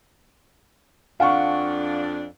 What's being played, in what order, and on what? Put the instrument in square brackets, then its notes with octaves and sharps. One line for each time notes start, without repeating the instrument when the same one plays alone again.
[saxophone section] F2 D4 [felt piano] F5 F#5 C#6